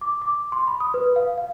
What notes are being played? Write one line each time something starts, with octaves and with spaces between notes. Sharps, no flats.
D6
D6
C6
B5
D#6
B4
F5
F5